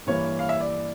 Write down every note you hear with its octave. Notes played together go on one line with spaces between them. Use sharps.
G2 E3 A#3 C#5
F5
E5
D5